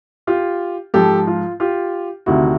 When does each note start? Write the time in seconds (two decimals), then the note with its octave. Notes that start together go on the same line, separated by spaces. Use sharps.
0.27 F4 G4
0.94 G#2 F3 G4 A4
1.27 F4
1.60 F4 G4
2.26 D2 C3 D#3 E4 F#4